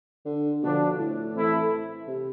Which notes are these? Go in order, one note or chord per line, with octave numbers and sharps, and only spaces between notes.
D3
B2 D3 F3 B3 D4
A2
E3 A3 C4 E4 A4
C3